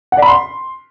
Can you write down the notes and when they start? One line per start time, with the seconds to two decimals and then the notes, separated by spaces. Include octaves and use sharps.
0.12 F#5
0.17 D5
0.22 B5
0.27 C6